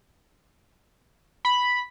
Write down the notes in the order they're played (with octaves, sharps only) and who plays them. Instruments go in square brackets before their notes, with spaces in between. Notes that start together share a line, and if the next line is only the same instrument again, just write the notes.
[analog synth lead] B5